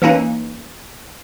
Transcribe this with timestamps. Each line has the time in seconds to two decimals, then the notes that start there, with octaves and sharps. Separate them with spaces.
0.02 E3 A#3 C#4 D#4